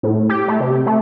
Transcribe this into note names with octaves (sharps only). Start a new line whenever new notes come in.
A2
G4
A3
C3
A3